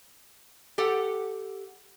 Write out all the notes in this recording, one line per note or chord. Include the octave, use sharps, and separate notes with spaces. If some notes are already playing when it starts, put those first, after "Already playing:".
G4 A4 F#5